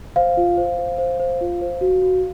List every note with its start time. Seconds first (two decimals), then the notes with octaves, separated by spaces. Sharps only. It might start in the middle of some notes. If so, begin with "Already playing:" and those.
0.16 C5 F5
0.37 F4
0.57 C5
0.79 C5
0.98 C5
1.20 C5
1.41 F4
1.61 C5
1.81 F#4
2.02 F#4